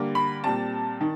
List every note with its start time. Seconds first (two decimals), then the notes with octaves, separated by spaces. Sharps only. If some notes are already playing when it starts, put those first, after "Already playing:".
Already playing: D3 G3 A#3
0.15 B5
0.44 A#2 G3 C4 A5
1.01 D#3